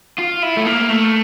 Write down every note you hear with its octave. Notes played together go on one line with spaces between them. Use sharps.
F4
E4
A3
A#3
A3